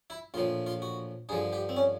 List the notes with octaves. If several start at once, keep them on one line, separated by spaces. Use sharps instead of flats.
E4
A#1 A2 F3 F4
F4
F#4
G2 D3 F3 G#4
G4
C4
C#4